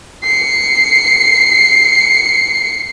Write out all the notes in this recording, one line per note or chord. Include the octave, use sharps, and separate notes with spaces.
C7 C#7